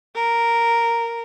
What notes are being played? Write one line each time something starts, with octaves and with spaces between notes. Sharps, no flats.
A#4